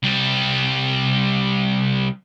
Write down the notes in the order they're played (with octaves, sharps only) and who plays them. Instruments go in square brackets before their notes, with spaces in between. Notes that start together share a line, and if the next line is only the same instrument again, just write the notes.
[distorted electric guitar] C2 G3